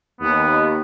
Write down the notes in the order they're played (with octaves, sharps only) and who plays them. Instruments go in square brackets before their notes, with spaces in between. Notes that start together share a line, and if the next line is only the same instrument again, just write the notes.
[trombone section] D#2 [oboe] B3